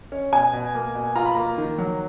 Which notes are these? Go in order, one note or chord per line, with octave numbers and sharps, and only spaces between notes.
C#4
B2 G#5
B2
A#3
B2
F4 A#5
B5
A#3 A#5
D#3
F#3